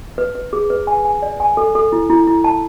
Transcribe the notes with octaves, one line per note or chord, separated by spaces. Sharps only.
B4
B4
G#4
B4
G#5
G#5
D5
G#5
A4
A4
E4
E4
E4
A5